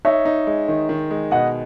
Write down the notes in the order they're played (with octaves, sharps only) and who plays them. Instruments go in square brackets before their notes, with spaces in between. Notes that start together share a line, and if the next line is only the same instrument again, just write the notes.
[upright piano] D#4 [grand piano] C#5 E5
[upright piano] D#4
G#3
D#3
D#3
G#3
[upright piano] B2 [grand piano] D#5 F#5